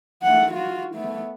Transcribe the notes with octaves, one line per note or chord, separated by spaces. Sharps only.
A3 F#5
F4 F#4
A3 B3